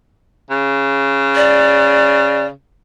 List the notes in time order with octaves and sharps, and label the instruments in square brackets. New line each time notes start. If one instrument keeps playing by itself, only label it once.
[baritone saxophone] C#3
[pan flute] D5